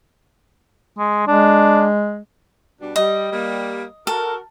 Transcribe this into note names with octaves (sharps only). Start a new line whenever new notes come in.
G#3
G#3 D4
B2 G3 D4
G3 D#5
G3 A#3
F#4 A4 A#4